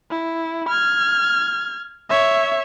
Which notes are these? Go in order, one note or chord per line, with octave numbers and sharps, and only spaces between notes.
E4
F6 G#6
C#5 E5